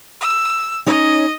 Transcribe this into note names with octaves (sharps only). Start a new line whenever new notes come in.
E6
C#4 D#4 C#5 D#5